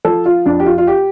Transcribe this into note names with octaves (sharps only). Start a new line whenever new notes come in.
F3 A4
F4
F2 D4
G4
F4
F4
G4